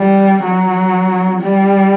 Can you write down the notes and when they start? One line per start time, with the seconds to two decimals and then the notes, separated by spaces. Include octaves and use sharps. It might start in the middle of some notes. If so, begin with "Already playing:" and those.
Already playing: G3
0.43 F#3
1.42 G3